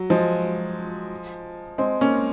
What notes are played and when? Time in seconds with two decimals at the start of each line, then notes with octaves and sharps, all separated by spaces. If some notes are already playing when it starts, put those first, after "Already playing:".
Already playing: F#3
0.10 F3 G#3
1.78 G#3 C4
2.01 A#3 C#4